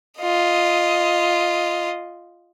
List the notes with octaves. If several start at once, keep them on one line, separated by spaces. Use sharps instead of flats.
F4 D#5